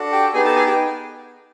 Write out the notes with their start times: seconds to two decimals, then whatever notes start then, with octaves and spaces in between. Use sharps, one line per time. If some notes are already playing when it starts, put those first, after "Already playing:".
Already playing: D4 F#4 A4
0.12 G4 G5
0.34 B3 D#4 G4 G#4 G#5
0.44 A4 A5
0.56 G#4 G#5
0.67 G4 G5